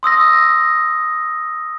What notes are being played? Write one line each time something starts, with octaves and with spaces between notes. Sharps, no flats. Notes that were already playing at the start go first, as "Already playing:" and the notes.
C6 D#6 E6 A#6